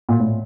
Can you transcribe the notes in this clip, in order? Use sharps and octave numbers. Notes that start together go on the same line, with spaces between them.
A#2
A2